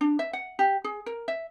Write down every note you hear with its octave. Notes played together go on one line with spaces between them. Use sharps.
D4
E5
F#5
G4
G#4
A#4
E5